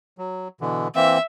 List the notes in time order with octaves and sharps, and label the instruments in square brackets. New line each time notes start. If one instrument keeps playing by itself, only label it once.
[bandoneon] F#3
B2 D3 E3
[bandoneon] E3 A#3 C4 [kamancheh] E5